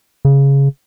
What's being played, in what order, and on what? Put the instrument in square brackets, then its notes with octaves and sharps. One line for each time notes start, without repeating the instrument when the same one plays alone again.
[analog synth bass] C#3